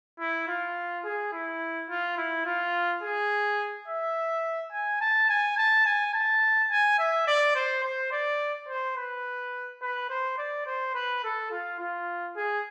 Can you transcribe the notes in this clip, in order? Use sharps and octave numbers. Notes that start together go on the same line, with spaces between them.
E4
F4
G#4
E4
F4
E4
F4
G#4
E5
G#5
A5
G#5
A5
G#5
A5
G#5
E5
D5
C5
C5
D5
C5
B4
B4
C5
D5
C5
B4
A4
F4
F4
G#4